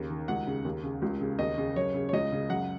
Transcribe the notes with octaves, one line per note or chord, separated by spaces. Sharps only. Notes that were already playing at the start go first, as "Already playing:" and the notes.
Already playing: D#2 C#3
D#3
C#2 F#5
C#3
D#2
C#3
C#2
C#3
D#2 D#5
C#3
F#2 C#5
C#3
C#5
C#2 D#5
C#3
F#2 F#5